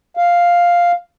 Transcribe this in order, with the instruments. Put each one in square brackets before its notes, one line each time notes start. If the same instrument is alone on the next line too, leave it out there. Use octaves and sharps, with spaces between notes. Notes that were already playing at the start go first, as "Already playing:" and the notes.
[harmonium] F5